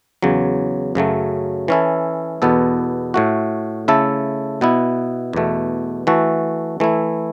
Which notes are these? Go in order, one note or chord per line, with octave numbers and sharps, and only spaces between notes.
E2 C#3 F#3
F#2 C#3 F#3 A3
E3 C#4 E4 A4
E2 B2 B3 A4
A2 A3 F#4
C#3 A3 E4 A4
B2 B3 E4
E2 B2 A3
E3 A3 F#4 A4
E3 A3 E4